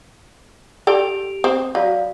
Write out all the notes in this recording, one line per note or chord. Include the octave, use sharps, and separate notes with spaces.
G4 A4 D5 G5 D7 F7
C4 D#6
F#3 F#4 D5 F5